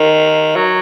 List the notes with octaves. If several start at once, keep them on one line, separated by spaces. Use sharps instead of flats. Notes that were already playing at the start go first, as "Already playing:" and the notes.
Already playing: D#3
F#3